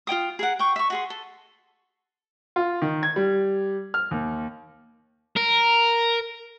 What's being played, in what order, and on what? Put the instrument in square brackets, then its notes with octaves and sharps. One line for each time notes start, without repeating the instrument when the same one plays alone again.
[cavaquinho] F4 C#5 G5 D#6
G#4 A#4 F#5
G5 C#6
E5 C#6
F#4 G#4 C6
A4
[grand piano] F4
D#3
G#6
G3
F6
D#2
[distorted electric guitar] A#4